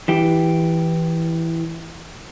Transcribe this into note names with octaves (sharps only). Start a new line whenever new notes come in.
E3 G4